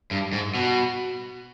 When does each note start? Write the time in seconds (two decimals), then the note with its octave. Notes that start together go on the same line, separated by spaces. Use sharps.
0.11 G2
0.33 G#2
0.55 B2